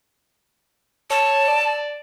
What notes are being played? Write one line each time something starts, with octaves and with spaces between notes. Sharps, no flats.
C#5 A5
D5